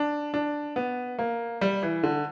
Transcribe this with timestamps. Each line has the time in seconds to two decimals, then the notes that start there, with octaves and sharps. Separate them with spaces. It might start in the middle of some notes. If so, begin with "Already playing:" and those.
Already playing: D4
0.34 D4
0.76 B3
1.19 A#3
1.61 G3
1.83 E3
2.03 D3